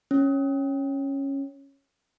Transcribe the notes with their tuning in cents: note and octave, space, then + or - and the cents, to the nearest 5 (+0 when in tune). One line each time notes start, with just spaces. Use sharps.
C#4 -10